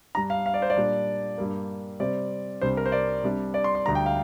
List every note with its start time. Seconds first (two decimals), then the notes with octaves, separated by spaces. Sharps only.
0.15 G2 G3 D4 A#5
0.30 F5
0.46 F5
0.54 D5
0.62 C5
0.70 D5
0.77 A#2 G3 D4
1.38 G2 G3 A#3
2.00 C3 G3 C4 D5
2.61 C2 C3 G3 D4 C5
2.77 A#4
2.86 C5
2.92 D5
3.24 C3 G3 D4
3.54 D5
3.64 C6
3.75 C6
3.86 D2 D3 G3 D4 A#5
3.95 G5
4.06 F5